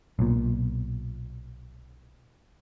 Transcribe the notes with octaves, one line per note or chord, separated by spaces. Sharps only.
B1 A#2